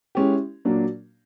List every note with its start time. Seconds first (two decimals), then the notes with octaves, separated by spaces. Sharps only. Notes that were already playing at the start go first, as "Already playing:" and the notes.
0.15 G#3 C#4 E4 G4
0.65 A#2 F#3 A#3 D4